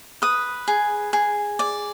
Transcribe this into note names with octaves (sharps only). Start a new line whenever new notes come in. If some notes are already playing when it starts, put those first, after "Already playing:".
B4 D#6
G#4
G#4
D5